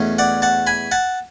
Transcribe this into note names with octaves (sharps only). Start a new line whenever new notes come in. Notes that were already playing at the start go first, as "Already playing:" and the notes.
Already playing: E2 B2 A3 C#4
D5 F#5
F#5 A5
G#5 B5
F#5 A5